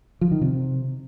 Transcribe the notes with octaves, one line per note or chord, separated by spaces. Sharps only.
F3
D#3
C3